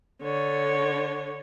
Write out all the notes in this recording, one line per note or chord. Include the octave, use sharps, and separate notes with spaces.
D3 C#5